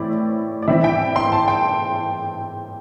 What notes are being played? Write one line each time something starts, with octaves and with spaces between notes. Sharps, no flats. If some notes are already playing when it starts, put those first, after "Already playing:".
Already playing: A2 E3 C4 E4 D5
D5
E3 C4 E4 E5
G5
C6
A5
G5